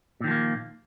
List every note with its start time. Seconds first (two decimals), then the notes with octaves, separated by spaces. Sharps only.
0.20 A#2
0.24 D#3
0.27 F3
0.31 A#3